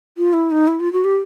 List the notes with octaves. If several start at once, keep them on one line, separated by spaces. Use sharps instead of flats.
F4
E4
D#4
E4
F4
F#4
G4